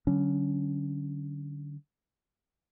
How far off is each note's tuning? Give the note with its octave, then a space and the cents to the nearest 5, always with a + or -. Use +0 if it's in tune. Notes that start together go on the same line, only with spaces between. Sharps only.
D3 +0 F#3 +35 C#4 +15